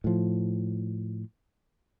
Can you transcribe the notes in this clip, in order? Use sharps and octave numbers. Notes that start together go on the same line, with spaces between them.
A2 F3